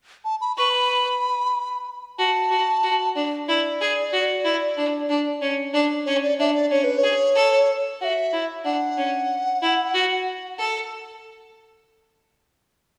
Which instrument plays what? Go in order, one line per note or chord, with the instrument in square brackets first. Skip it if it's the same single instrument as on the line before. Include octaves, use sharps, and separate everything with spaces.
[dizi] A5
B5
[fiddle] B4 [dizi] C#6
[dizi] B5
[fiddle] F#4 [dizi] A5
[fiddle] F#4
F#4
D4
[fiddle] E4 [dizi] D5
[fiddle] G#4
F#4
E4
D4
D4
C#4
D4
[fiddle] C#4 [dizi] C#5
[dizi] D5
[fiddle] D4 [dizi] E5
[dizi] D5
[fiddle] C#4 [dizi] C#5
[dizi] B4
C#5
[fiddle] G#4
A4
[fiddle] F#4 [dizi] F#5
[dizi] E5
[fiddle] E4
[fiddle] D4 [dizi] F#5
[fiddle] C#4
E4
F#4
A4